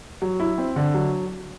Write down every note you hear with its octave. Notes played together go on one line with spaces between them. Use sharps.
F#3
E4
C4
D3
F#3